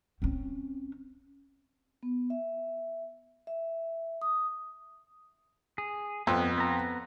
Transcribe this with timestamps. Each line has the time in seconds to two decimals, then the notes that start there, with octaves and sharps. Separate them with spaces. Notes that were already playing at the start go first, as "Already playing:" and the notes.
0.22 C4 C#4
2.03 B3
2.30 E5
3.47 E5
4.22 D#6
5.78 G#4
6.27 F2 B3
6.58 B3 A#5